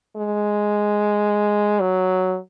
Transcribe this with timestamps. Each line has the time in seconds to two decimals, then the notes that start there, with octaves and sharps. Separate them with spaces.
0.16 G#3
1.80 F#3